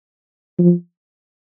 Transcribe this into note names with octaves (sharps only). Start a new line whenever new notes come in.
F3